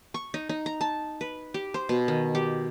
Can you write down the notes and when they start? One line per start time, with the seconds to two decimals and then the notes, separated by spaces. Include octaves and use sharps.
0.14 C#6
0.34 D#4
0.49 D#4
0.66 A#5
0.81 A5
1.21 B4
1.54 G4
1.74 C5
1.89 B2
2.08 D#3
2.35 G4